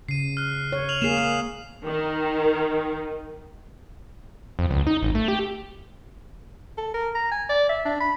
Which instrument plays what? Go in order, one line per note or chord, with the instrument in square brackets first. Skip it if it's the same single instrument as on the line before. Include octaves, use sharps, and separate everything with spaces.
[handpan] C#3 [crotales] C7 D#7
[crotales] F6 F#6
[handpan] C#5
[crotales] F6 F7 F#7
[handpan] A#3 G#4 [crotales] C7 E7
[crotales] D#6 F6 C7
[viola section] D#3
[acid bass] F2
C#2
D#4
G#1
A3
G4
[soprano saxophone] A4
A#4
A#5
G#5
D5
E5
D4
B5